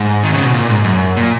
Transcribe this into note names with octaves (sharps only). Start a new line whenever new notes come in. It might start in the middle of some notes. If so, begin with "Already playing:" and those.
Already playing: G#2
D#3
C#3
B2
A#2
G#2
F#2
A#2